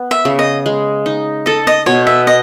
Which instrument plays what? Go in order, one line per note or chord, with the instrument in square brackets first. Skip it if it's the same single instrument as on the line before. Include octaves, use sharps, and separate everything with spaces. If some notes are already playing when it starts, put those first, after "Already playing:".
Already playing: [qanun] B3
[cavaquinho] E5
[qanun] C#3
[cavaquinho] D#5
[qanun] G#3
D#4
[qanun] A4 [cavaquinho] D#5
[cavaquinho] D#5
[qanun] B2 [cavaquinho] C#5
[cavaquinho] E5
D#5